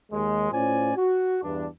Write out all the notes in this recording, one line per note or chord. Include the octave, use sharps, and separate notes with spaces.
D#2 G#3
A2 C#4 F4 C5 D5 G#5
F#4
E2 G2 D4